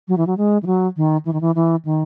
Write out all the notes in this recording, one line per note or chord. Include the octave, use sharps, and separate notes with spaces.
F#3
E3
F#3
G#3
E3
F#3
D#3
E3
D#3
E3
E3
D#3